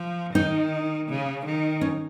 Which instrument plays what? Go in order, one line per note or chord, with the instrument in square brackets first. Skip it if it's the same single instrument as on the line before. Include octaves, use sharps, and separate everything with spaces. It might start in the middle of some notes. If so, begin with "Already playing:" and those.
Already playing: [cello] F3
[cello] D#3 [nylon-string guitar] D#4
[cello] C#3
D#3
[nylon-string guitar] C#4